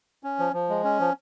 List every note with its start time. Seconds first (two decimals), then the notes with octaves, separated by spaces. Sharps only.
0.23 C#4
0.39 F3
0.53 F3
0.69 G#3
0.84 C#4
1.00 F3